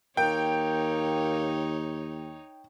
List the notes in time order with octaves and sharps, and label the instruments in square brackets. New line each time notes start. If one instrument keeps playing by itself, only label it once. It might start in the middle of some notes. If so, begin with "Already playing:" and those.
[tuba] D#2 [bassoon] A#3 [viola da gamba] D#4 C#5 [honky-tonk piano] G5